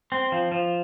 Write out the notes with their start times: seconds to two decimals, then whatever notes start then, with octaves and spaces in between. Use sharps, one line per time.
0.12 C4
0.32 F3
0.52 F3